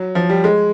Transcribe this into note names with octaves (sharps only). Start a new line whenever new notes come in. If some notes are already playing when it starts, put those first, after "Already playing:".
Already playing: F#3
F3
G3
G#3